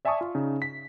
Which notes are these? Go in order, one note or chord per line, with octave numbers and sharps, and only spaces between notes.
D5 E5 G#5 A5 C#6 D#6
F4
C#3 D#4
B6